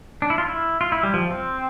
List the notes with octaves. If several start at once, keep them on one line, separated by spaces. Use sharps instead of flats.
D4
E4
F4
E4
F4
E4
G3
F3
C4